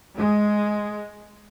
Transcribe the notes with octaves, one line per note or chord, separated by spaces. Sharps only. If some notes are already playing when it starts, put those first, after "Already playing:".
G#3